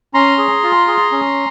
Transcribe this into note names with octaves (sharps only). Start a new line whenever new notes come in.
C#4 A#5 C6
G#4
F4
G#4
C#4